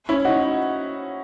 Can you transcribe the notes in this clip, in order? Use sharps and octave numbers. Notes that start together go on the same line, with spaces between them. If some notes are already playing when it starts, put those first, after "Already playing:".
C#4 E4
D#4 F#4